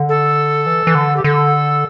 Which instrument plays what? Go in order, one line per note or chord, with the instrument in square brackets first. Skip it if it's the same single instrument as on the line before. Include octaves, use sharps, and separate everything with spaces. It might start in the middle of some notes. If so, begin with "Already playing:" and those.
Already playing: [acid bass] D3
[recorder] A4
[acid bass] E3
E3
D3
[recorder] G4
[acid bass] D3 [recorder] A4